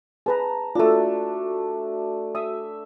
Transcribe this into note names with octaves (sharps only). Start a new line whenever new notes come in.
G#4 B4 A5 A#5
A3 D4 F4 F#4 A4
E5 D#6